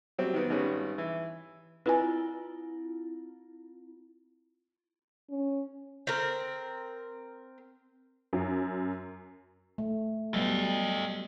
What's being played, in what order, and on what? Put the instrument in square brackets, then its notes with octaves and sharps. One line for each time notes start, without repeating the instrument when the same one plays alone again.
[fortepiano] F#3 G3 C4
D#3 B3
G#1 G3 C#4 B4
E3
[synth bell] C4 E4 F4 [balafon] B4 G#5
[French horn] C#4
[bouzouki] C4 A#4
[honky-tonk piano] F#2
[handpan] A3
[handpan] F#3 G3 B3 [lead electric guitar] A4 D#5